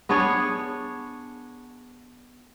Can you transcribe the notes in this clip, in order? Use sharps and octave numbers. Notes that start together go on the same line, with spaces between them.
B3 D4 G#4 C#5